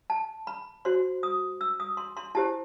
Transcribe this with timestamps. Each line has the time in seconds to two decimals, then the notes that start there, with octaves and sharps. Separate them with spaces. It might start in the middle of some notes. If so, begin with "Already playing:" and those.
0.10 A5
0.47 B5
0.85 F#4 C5 C6
1.23 D#6
1.61 E6
1.80 D#6
1.97 C6
2.17 C6
2.35 E4 G4 C5 A5